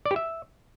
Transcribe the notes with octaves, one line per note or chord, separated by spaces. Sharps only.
D5
G4
E5